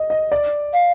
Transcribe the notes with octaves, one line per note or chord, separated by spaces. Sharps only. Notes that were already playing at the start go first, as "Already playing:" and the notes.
Already playing: D#5
D#5
D5
F5